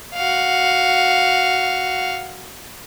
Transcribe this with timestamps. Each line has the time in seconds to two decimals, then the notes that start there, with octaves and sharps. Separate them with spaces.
0.14 F#4 F5